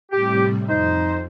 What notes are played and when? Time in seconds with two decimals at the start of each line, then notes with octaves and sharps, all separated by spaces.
0.12 A2 C3 G3 G4
0.69 F2 D#4 C5